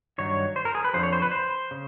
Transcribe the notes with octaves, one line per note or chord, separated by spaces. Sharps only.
G2 D#3 F#3 C#5
C5
A#4
G#4
B4
F2 D3 F3 C5
C#5
C5
B4
C5
C#3